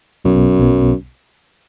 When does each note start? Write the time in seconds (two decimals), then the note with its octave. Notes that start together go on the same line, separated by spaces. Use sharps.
0.25 B1 F#2 B2 F#3 B3
0.58 B1 B2 F#3 B3